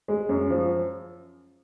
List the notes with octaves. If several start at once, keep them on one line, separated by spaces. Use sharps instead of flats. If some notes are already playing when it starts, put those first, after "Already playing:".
G#3
F#2
F3